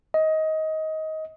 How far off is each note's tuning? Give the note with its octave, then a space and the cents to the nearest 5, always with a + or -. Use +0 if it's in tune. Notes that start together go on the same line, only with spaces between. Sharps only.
D#5 +20